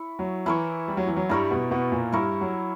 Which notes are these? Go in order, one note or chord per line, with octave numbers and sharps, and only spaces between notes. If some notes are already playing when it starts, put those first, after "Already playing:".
Already playing: E4 C#5
F#3
E3 E4 A#4 C#5
G3
F#3
E3
F#3
G2 G3 E4 A#4 C#5
B2 B3
B2 B3
A#2 A#3
G2 G3 E4 A#4 C#5
F#3